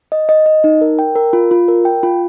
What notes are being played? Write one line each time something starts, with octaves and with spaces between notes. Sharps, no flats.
D#5
D#5
D#5
D#4
A#4
G5
A#4
F4
F4
A#4
G5
F4